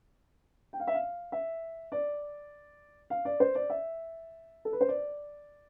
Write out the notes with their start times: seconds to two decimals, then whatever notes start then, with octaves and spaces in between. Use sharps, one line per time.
0.73 G5
0.80 F5
0.88 E5
0.94 F5
1.32 E5
1.92 D5
3.10 F5
3.25 D5
3.40 C5
3.55 D5
3.70 E5
4.65 A4
4.73 B4
4.81 C5
4.88 D5